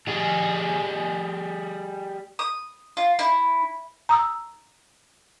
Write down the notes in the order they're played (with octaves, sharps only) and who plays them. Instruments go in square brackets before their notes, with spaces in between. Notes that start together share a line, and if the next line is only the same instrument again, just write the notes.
[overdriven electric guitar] G3 G#4
[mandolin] D#6
F4
E4
[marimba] A#5 D#6 E6